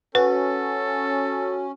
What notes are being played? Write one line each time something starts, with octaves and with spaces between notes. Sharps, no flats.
C#4 F#4 A4 B4